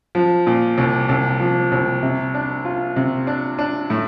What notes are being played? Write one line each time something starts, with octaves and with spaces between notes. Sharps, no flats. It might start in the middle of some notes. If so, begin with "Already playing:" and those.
F3
A#2
C2
C2
F3
C2
C3
D4
F4
C3
D4
D4
A2